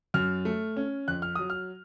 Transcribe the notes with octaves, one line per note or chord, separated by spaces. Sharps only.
F#2 F6
A3
C#4
F2 F#6
F6
F#3 D#6
F6